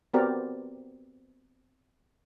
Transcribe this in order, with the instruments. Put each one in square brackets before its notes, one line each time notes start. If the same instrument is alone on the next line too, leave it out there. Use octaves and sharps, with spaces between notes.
[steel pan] B3 C4 F#4 G4 A#4 D5